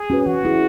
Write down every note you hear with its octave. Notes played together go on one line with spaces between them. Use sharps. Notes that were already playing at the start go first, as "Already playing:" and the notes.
Already playing: G#4
C#4 F#4 B4
E3 F#4
C#4 E4 G#4